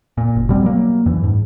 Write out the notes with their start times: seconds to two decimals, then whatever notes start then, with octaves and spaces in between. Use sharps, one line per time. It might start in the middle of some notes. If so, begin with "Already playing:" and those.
0.18 A#2
0.35 F#1
0.49 B2 G3 C4
0.63 F#3 A#3
1.06 F#2 E3
1.24 G#2